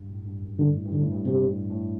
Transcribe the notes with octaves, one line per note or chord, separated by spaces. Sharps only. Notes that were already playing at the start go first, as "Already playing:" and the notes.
Already playing: G2
A2
G2
F#2
G2 D3
A2
G2
D3
A2
G2
G2 C3
A2
A2